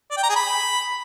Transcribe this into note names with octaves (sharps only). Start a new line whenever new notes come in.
D5
G5
A#5
G#4
B5